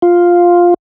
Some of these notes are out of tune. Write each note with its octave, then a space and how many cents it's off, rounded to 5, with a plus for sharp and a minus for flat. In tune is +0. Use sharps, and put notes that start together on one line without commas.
F4 +5